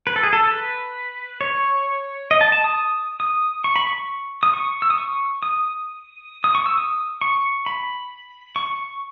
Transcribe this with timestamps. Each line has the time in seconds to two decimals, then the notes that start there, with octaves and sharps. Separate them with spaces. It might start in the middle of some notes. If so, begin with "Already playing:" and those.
0.07 B4
0.16 A4
0.23 G#4
0.33 A4
0.51 B4
1.41 C#5
2.31 D#5
2.41 A5
2.52 A5
2.64 D#6
3.20 D#6
3.64 C#6
3.76 B5
3.87 C#6
4.43 D#6
4.53 C#6
4.82 E6
4.90 D#6
4.98 C#6
5.43 D#6
6.44 D#6
6.55 C#6
6.66 E6
6.78 D#6
7.21 C#6
7.66 B5
8.56 C#6